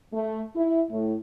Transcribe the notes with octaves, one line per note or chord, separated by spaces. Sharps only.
A3
E4
A2